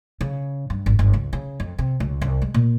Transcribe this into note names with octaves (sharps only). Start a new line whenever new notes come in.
C#3
G2
G#1
G1
C#2
C#3
F2
C3
C#2
C2
G#3
A#2